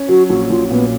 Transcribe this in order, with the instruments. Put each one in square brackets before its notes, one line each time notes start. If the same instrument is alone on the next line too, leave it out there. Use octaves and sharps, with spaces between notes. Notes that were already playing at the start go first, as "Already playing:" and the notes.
Already playing: [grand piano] C#4
[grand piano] F#3 [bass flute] F#4
[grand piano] A#1 [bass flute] F#4
[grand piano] A#1 [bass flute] F4
[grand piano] A#2 [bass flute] B3